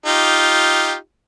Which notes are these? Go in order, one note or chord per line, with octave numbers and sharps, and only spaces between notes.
D#4 F4 G4